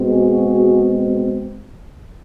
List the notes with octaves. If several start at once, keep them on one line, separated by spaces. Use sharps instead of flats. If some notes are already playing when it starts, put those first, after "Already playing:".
Already playing: B2 G#3 C4
F#4 G#4